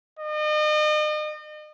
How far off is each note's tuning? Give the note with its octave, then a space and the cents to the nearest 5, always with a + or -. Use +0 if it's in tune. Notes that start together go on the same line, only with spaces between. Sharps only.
D#5 -40